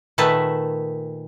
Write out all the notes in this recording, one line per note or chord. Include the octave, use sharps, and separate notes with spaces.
A#2 D#3 A3 B4 A5